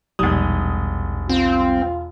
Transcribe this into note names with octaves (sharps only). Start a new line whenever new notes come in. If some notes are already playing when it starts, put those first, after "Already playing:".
E1 A#1 G#2 G3 D#6
C4 F4